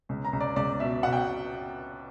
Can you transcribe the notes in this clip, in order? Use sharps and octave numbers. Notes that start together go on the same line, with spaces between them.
C#2
A#5
C#2
D5
C#2 D5
B2 E5
B2 F#5
G5